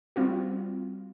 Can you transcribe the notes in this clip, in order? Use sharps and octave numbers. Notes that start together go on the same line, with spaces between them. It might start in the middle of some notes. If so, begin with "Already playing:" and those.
G3 C4 F4 F#4